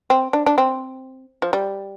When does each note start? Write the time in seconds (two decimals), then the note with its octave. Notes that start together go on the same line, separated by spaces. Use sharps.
0.10 C4
0.33 D4
0.46 D4
0.58 C4
1.42 F3
1.53 G3